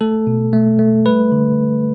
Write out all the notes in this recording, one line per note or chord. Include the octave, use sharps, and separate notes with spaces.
A3 A4
B2
A3
A3
G3 B4
D3